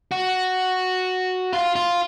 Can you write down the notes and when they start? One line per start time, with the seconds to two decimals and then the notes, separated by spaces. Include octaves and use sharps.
0.11 F#4
1.53 F4
1.76 F4